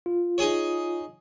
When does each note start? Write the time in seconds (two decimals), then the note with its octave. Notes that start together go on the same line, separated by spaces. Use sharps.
0.06 F4
0.38 D#4 G#4 C#5